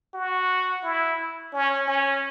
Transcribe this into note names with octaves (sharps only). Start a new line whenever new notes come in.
F#4
E4
C#4
C#4